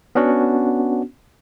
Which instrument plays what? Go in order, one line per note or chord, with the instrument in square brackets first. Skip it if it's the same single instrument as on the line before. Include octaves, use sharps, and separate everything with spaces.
[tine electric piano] B3 C#4 D4 F#4